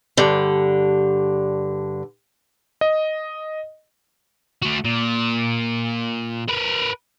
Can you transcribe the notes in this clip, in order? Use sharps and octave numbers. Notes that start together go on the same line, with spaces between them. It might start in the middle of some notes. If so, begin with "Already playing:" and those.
G2 D3
D#5
A3 F#4
A#2
A#4 B4